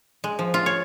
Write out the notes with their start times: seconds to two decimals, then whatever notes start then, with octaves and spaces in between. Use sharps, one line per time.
0.24 G#3
0.39 F3
0.54 F4
0.66 C#5